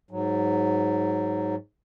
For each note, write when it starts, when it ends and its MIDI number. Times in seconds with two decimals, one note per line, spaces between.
0.11 1.55 44
0.11 1.55 54